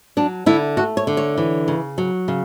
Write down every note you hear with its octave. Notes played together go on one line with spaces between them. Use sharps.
F#3 D4
D3 E4
A3 F#4
C#5
D3
C#5
E3
C#3
F#3
C#3